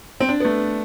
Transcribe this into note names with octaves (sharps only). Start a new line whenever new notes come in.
C4
D4
B3
A3